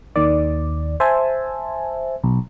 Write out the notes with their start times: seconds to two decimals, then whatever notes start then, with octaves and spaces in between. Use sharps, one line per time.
0.16 D#2 D#3 D5
1.00 C5 E5 G#5 A5
2.24 B1